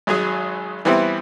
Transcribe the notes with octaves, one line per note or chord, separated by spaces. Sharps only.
G#1 F#3 G#4
E3 G3 B3 C4 E4